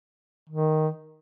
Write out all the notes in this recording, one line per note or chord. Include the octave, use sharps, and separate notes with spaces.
D#3